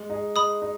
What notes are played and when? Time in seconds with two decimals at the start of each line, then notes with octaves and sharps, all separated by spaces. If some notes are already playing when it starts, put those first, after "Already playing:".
Already playing: G#3
0.10 D#4 G#4
0.36 G#3 B5 D#6
0.62 D#4